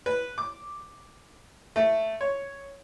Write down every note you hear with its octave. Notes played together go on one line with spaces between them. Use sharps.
B4
D6
A3
C#5